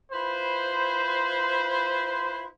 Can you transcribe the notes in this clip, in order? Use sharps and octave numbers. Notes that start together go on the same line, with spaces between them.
E4 F4 B4 C5